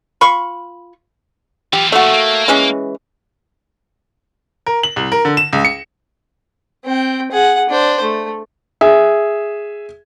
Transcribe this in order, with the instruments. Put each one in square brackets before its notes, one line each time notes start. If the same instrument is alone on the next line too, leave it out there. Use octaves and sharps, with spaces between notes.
[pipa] F4 B5 C#6
[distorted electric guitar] E3 F4 [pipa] G4
[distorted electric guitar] D#2 F3 [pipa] A3 F#4
[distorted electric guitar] A#3
[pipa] E3 G#3 C#4
[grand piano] A#4
F#7
C2
A#4
D3
E7
C#2
C#7
[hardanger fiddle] C4 G5
G#4 F#5
D4 C5
A3
[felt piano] G#4 E5